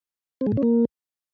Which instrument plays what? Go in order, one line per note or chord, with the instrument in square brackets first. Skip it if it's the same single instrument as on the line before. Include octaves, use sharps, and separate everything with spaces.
[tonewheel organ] C4
G#3
A2
C#4
A#3